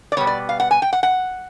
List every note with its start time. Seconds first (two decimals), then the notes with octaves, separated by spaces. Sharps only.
0.12 D5
0.17 B2 G3 B3 C#5
0.27 D5
0.49 F5
0.60 F#5
0.71 G#5
0.82 G5
0.93 F#5
1.03 F#5